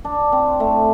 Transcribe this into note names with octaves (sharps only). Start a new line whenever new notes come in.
D4
C4
A3